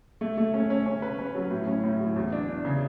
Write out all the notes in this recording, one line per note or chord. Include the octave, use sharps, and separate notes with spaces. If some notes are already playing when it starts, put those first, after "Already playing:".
A3
A3
C#4
C#4
C#4
B4
C#4
F#3
A2
C#4
A2
F#3
E2
D4
D4
C#3